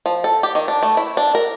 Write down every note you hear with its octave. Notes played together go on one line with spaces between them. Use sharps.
F3
A4
G4
D#3
D4
A3
E4
D4
A#4